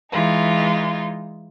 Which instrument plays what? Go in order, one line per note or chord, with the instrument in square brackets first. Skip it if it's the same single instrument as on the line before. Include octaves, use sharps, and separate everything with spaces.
[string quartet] E3 G#3 D#4 F4